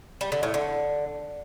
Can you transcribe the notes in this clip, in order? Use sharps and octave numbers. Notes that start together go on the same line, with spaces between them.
G3
D3
A2
D3